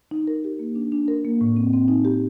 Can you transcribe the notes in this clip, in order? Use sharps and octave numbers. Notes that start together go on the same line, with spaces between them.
D#4
A#4
G4
A#3
D4
D4
A#4
A#3
A2
C4
C4
D#4
G4